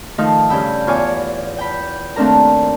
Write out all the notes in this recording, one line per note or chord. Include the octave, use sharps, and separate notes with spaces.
D#3 F3 A3 D#4 F4
G2 C#3 G5 B5 E6
E2 F4 C#5 G#5 D6
G5 B5
D#2 A3 C4 D4 A#4 A#5